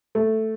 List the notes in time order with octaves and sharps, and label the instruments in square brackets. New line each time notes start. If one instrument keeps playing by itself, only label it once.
[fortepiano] A3